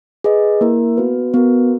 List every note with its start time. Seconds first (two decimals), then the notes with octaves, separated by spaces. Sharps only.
0.24 G#4 B4 D#5
0.61 A#3 E4 A#4
0.97 B3 F#4 B4
1.34 B3 F#4 A#4